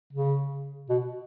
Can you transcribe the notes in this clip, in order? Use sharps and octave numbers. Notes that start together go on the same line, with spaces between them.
C#3
B2